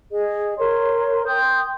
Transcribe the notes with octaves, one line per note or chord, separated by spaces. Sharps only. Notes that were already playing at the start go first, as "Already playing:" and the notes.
G#4 D#5
A#4 C#5 C6
G5 C6 D#6 G6